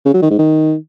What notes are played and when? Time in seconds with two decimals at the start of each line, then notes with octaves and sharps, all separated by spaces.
0.05 C#3
0.14 F#3
0.22 D#3
0.30 G#2
0.39 D#3